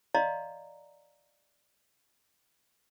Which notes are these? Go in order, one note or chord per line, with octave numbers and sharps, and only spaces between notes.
D5 D#5 F5 A#5 C6